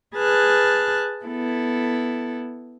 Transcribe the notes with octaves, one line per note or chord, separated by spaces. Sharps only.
G#4 B4 A5 F6 F#6
B3 E4 A4